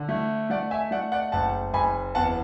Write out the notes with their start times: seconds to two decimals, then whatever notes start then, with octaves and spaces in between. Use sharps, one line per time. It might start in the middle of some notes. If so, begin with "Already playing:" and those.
Already playing: D3
0.09 A3
0.50 A3 D5 F#5
0.71 E5 G#5
0.91 A3 D5 F#5
1.12 D5 F#5
1.32 F#1 F#5 A5
1.73 F#1 G#5 B5
2.15 E2 F#5 A5